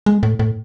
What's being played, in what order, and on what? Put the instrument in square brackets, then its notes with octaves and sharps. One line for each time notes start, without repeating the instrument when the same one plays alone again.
[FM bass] G#3
A2
A2